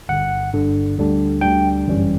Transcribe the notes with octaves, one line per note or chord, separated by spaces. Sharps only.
G1 G2 D3 F#5
G1 G2 D3
D2 D3 G3 D4
D2 D3 G3 D4 G5
G1 F#2 E3 G3 C#4